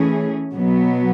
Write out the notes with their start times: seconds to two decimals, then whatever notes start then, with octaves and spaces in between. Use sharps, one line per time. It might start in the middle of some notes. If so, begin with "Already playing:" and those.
Already playing: E3 A3 C#4 G#4
0.53 B2 F#3 B3